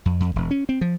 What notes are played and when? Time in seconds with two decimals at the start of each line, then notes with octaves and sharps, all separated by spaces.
0.06 F2
0.20 F2
0.36 E1
0.51 C#4
0.69 C4
0.81 F3